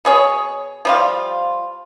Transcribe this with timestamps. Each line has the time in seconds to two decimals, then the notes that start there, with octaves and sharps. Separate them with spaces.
0.05 B2 G#4 C#5
0.85 F3 G3 F4